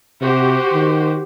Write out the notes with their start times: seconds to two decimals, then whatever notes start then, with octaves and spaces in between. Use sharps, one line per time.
0.21 C3 F#4 G4 C5
0.73 D#3